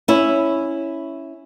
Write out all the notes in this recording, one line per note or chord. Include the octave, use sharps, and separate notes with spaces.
C#4 E4